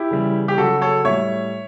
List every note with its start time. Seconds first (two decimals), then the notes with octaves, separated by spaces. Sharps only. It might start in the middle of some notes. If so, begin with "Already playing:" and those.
Already playing: E4 G4
0.11 C#3 E3 G3
0.48 G4
0.57 C#3 F#3 F#4 A4
0.81 A4 C#5
1.04 A2 G3 C#5 E5